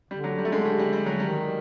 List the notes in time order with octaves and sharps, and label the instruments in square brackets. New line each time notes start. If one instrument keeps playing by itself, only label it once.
[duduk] D3 [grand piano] G3
[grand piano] F#3
G3
A3
G#3
G3
G3
G3
F#3
[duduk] D#3 [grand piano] G3